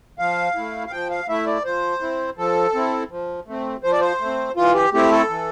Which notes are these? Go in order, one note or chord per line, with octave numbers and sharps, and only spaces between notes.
F3 F5
A3 E4
F5
F3 G5
F5
A3 E4 E5
D5
F3 C5
C4 E4
F3 A4
C4 E4
F3
A3 C4
F3 C5
D5
C5
A3
C4
E3 F4
G4
A3 C4 E4 G4
A4
E3